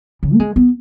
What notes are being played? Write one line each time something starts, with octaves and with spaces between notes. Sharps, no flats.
C#3
A#3
G#3
B3